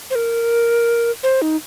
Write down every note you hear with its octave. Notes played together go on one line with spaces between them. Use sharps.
C5
A#4
C5
D#4